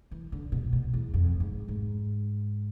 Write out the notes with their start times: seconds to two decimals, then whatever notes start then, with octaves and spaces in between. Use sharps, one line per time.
0.11 E3
0.32 D3
0.52 B2
0.73 B2
0.93 E2
1.14 F2
1.40 G#2
1.68 G#2